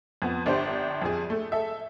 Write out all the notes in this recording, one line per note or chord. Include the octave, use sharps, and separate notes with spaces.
F2 B3
G1 D4 G4 C5
F2 G#4
A3
A4 E5